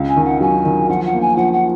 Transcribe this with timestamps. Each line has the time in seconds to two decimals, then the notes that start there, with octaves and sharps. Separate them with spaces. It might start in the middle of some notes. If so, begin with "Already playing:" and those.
Already playing: C#2
0.08 G#5
0.16 D#3
0.24 F#5
0.41 F#3 G#5
0.65 D#3
0.89 F3 F#5
1.05 F#5
1.13 A#3
1.21 G#5
1.37 F3 F#5
1.53 F#5